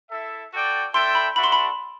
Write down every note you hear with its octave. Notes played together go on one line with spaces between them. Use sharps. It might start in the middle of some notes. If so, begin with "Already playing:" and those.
E4 A4 E5
F#4 A4 D5 G5
D4 A4 E5 G5 C6
B5
D4 F#4 A4 E5 B5
C6
B5